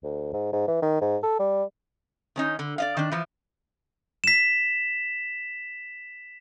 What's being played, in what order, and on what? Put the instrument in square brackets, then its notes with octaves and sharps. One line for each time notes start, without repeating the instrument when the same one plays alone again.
[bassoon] D2
G#2
G#2
E3
D#3
G#2
A4
G3
[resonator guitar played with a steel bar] D#3 C#4 D#4
D3
D5 D#5 F5
D#3 D4
E3 F3
[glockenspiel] B6 E7